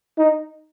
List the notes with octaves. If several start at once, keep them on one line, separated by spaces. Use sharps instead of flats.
D#4